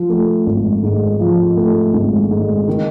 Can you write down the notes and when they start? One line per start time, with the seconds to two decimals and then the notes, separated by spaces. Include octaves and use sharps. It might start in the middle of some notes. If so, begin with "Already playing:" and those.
Already playing: F3
0.10 A3
0.46 G#1
0.83 G#2
1.20 F3
1.57 A3
1.93 G#1
2.31 G#2
2.68 D#3